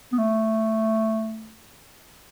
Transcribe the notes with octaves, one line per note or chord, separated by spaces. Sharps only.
B3
A3